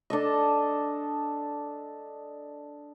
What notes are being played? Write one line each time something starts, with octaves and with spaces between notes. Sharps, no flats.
D4 A4 D#5